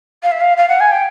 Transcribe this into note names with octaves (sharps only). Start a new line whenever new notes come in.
F5
E5
F5
F5
F#5
G#5
G5